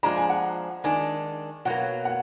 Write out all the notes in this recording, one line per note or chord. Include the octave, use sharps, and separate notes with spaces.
F3 G#3 D4 A#5
G#5
F#5
D#3 G#3 D4 G#5
B2 F#3 A#3 F#5
F#5